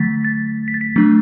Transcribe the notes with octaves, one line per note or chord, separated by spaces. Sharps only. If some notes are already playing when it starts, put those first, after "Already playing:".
Already playing: D3 F#3 A3 A6 B6
A6
B6
A6
B6
F#3 A3 D4 A6